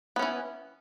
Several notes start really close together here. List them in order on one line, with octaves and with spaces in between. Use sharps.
B3 C#4 E3